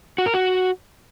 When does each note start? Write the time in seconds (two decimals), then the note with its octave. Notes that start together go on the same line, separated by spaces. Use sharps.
0.18 F#4
0.26 A#4
0.34 F#4